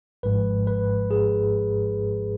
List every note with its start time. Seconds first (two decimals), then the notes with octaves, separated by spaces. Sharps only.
0.23 G#1 G#2 F3 G#3 B4
0.67 B4
1.11 G#4